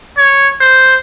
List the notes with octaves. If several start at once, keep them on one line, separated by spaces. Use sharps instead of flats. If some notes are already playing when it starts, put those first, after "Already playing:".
C#5
C5